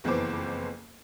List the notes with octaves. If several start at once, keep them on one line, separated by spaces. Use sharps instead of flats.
F#1 F2 E3 B3 C5 D6